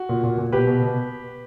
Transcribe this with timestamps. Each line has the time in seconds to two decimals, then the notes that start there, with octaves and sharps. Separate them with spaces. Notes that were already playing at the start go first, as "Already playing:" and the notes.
Already playing: F#4
0.09 A#2
0.23 A#2
0.38 A#2
0.53 B2 G4 B4
0.67 B2
0.83 B2